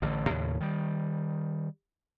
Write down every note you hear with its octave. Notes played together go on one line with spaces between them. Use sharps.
A1 D3
D#2 A2 C#3
D#3 G3